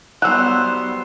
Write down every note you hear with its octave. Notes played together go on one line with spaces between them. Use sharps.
F#3 G3 B3 C5 E6 F#6